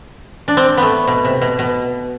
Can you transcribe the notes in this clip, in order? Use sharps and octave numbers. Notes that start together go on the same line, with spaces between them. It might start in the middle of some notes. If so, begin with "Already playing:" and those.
D4
C4
A3 B3
B2
C3
B2
B2